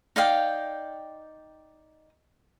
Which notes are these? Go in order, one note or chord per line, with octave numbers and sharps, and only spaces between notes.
D#4 D5 F5 G5